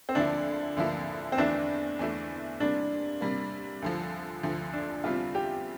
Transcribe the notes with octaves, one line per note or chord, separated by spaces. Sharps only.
C4
D2 D3 F3 A#3 D4 E4
D2 D3 F3 A#3 E4
C4
E2 E3 A3 D4 E4
E2 E3 A3 E4
C3 G3 A#3 D4
C3 G3 A#3
D2 D3 F3
D2 D3 F3
D4
E2 C3 G3 C4 E4 F4
G4